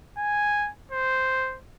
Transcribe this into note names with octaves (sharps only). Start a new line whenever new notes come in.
G#5
C5